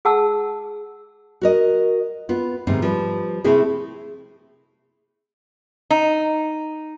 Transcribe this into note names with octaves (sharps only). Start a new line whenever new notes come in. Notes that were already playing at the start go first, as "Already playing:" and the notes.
G#4 F#5 A5 E6
F#4 A#4 D#5
B3 F4
G#2 C3 D#3 B3 C4
F3 G3 B4
C3 A3 C4 E4 G#4 A4
D#4